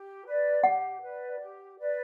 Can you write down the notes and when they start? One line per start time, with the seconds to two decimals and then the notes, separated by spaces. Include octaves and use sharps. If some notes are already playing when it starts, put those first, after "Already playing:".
Already playing: G4
0.26 B4 D5
0.64 G4 F#5
1.01 B4 D5
1.40 G4
1.77 B4 D5